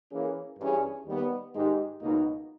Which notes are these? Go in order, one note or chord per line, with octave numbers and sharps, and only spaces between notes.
E3 A#3 C#4 G#4
G2 E3 G3 C#4 G#4
D#2 D#3 G3 B3
G#2 D#3 G#3 D#4 G4
C#2 B2 A#3 D#4